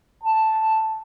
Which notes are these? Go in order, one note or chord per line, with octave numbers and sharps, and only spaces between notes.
A5